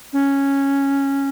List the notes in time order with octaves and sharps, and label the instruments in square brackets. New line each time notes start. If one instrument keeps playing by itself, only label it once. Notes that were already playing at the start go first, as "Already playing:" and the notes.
[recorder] C#4